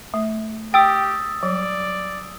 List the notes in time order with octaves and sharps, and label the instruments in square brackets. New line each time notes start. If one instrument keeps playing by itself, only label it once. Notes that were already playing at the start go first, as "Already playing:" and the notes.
[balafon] A3
[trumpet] G4 [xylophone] G5 [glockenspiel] D#6 E6 A6
[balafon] F#3 G3 [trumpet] D5